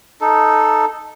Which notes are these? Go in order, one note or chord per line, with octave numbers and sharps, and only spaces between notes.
D#4 A4